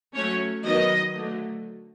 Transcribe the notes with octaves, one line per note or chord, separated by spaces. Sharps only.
F#3 A3 C#4 C#5
D#3 F#3 B3 D#5
D3 F#3 A3